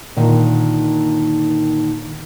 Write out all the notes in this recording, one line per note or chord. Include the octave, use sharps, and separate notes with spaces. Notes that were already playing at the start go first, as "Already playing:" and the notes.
A#2 D3 D#3